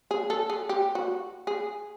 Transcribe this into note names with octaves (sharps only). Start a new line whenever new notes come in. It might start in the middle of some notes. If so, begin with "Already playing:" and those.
G#4
A4
G#4
G4
F#4
G#4